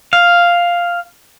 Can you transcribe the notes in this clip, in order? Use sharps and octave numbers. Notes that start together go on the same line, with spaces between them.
F5